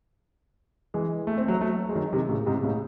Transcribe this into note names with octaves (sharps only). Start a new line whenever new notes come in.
E3 G#3
A3
C4
F#3 A3
F#3 A3
G#3
D#3 F#3
C3 D#3
A2 C#3
G#2 C3
A2 C#3